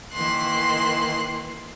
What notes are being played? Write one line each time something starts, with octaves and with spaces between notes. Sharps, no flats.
D#3 E3 A#3 C6 F#6